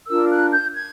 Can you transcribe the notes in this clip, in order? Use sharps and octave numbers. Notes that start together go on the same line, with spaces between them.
D4 F4 A#4 E6
F#6
G6
G#6